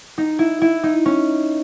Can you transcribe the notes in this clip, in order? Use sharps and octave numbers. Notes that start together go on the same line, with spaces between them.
D#4
E4
E4
D#4
C#4